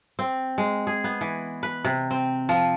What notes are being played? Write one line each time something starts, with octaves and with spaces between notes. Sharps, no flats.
C4
G#3
G#4
B3
E3
B4
C3
C4
F3